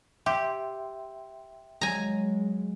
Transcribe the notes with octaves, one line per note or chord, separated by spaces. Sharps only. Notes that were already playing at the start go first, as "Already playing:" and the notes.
G4 E5 G5 C6
F#3 G#3 G#5 A#5